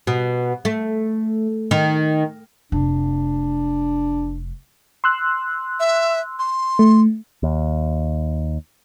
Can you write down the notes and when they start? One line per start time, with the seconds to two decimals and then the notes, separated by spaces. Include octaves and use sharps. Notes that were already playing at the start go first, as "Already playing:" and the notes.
0.07 B2
0.65 A3
1.71 D#3
2.72 F1 D4
5.04 C6 E6 F#6
5.80 E5
6.39 C6
6.79 A3
7.43 D#2